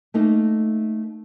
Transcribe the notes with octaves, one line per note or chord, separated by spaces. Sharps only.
A3 A#3 D#4